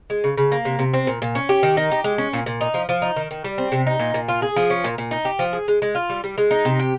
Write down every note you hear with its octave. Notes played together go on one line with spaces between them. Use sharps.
G#3
C#3
C#3
A#3
C3
C3
C4
A#2
A#2
C#4
G4
D#3
D#4
G4
G#3
C#4
A#2
A#2
D#4
F3
F3
D#4
D#3
D#3
G3
C4
C3
D#4
A#2
A#2
F4
G#4
F3
C#4
A#2
A#2
D#4
G4
F3
G#4
G#3
G#3
F4
G3
G3
G#3
D#4
C3
G4